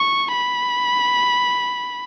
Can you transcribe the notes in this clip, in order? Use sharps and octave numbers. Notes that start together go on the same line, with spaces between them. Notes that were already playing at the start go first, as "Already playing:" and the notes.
Already playing: C#6
B5